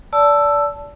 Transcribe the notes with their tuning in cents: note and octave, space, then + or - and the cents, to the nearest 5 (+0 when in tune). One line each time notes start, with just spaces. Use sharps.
D5 -25 A5 +0 E6 +10